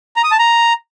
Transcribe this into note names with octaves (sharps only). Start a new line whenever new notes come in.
A#5
D#6
A5
A#5